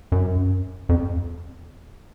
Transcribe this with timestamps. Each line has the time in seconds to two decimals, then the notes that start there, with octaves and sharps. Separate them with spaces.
0.12 F#2
0.89 F2